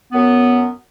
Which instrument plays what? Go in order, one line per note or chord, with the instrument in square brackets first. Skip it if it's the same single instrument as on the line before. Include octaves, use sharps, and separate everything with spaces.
[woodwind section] F#2 B3